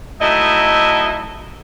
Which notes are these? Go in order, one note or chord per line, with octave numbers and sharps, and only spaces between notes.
F#3 A3 D#4 E4 D#5 E5